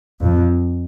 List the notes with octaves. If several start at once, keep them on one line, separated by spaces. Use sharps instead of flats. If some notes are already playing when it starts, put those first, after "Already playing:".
F2